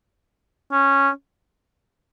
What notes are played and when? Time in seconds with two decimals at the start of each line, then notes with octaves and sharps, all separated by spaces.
0.72 C#4